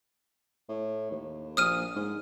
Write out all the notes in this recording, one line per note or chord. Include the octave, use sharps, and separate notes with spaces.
A2
D#2
A#1 D#6 F6 D#7
G#2